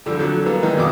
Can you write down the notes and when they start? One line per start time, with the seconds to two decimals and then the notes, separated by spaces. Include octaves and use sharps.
0.06 F2 D3 F3 G3
0.19 D3 F#3
0.46 E3 G3 A#3 B3
0.63 D#3 G#3
0.76 A1 F2 B2 F#3 D6 D#6